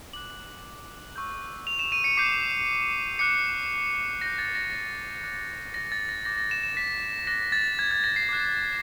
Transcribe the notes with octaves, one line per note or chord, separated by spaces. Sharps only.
D6 F#6 F#7
C#6 E6 G6
F7
E7
D#7
C#7
D6 G6 C7
D6 F#6 C#7
D6 G6 A#6
A6
A#6
D6 F#6
A#6
A6
A#6
D6 G6 A#6
A#6
E7
E7
B6
D6 F#6 A#6
A6
G#6
G#6
A#6
C7
D6 F#6